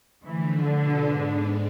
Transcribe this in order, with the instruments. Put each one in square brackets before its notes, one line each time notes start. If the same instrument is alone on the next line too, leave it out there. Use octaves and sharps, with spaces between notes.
[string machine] D3 F3 A3 [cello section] E3
[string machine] B2 B3 F4 A4 [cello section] D3
[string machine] G#2 G#3 B3 D4